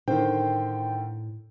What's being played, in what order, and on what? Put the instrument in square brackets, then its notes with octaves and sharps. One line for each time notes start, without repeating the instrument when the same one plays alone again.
[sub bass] A2 [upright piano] D3 D#3 [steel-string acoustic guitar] C5 [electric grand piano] G5